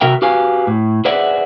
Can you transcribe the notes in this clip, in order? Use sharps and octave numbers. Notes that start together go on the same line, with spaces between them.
C3 F#4 A#4 E5 G5
F#4 G4 B4 F5 G#5
A2
G#4 B4 C5 D5 E5 F#5